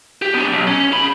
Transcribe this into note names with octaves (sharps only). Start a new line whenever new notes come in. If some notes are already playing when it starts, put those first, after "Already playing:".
G4
B3 D4
B1
C#4
G#4 B5